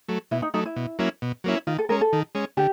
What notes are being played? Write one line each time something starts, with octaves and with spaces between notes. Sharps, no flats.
F#3 A3
B2 E4
D#4
F#3 A3 D#4
E4
B2
F#3 A#3 C#4 E4
B2
F#3 A#3 C#4 E4
D#3 F4
A4
G#3 C#4 A#4
A4
D#3
G#3 C#4
D3 G4